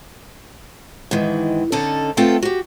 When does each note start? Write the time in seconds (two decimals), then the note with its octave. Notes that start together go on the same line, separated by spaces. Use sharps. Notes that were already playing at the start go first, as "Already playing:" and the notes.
1.11 G#2 D#3 E3
1.72 D3 C#4 D#4 A4
2.17 A3 B3 C4 F4 A4 G5
2.42 F#4 G4